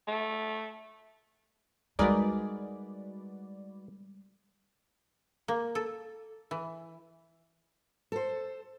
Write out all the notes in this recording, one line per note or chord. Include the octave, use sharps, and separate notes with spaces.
A3
G3 G#3 D#4 F#4 G#4 A#4 B4 D5
A#3
A4
E3
A4 C5